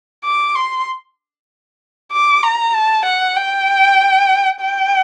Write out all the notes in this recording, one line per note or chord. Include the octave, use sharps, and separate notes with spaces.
D6
C6
D6
A#5
A5
F#5
G5
G5